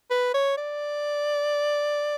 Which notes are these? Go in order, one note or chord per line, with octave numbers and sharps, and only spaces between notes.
B4
C#5
D5